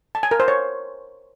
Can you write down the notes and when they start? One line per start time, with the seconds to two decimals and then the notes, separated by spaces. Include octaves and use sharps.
0.15 A5
0.23 G#5
0.31 A#4
0.40 C5
0.48 C#5